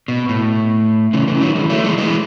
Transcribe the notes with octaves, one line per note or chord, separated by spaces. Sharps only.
B2
A2
C#3 E3
C#3 E3
D#3 F#3
E3 G#3
F#3 A3
E3 G#3
E3 G#3